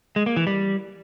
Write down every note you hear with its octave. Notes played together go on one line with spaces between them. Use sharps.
G#3
A#3
E3
G3